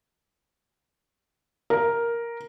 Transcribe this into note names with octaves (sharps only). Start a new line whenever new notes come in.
A#4